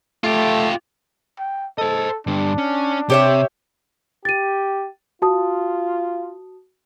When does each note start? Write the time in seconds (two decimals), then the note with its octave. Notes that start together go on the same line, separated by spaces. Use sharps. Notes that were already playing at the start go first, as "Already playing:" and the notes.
0.24 A3 F4 G4
1.39 G5
1.78 A4 C5 D#5
2.27 G2 D3 D4
2.58 C#4
3.10 C3 G4 C#5 E5
4.25 G4 A6 D#7
5.22 F4 F#4 A5 D#6